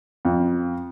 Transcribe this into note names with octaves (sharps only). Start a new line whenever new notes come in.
F2